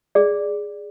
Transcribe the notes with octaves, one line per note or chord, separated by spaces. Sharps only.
G#4 D5